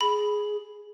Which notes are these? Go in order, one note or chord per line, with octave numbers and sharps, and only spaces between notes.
G#4 B5